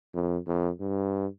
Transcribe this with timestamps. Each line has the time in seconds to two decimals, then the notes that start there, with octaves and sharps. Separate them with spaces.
0.14 F2
0.47 F2
0.80 G2